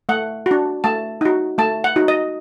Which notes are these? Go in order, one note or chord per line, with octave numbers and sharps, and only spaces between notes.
A3 F#5
D4 F#4
A3 A5
D#4 F#4
A3 A5
F#5
D#4 F#4
D#5